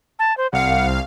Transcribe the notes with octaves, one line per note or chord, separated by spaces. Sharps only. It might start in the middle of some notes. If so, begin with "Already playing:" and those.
A5
C5
C2 F5 F#5